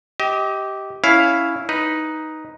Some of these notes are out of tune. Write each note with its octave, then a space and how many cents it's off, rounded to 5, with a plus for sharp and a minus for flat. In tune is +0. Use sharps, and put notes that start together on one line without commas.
G4 -10 D#5 +30
C#4 +10 E4 +0 F5 +0
D#4 +5 B4 +0